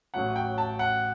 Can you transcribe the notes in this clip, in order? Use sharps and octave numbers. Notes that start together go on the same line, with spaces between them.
A1 A2 F#3 F#5
G5
A5
F#5